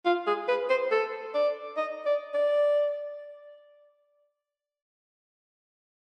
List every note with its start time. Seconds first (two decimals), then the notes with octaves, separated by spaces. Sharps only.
0.06 F4
0.27 G#4
0.48 B4
0.70 C5
0.91 A4
1.34 D5
1.77 D#5
2.06 D5
2.34 D5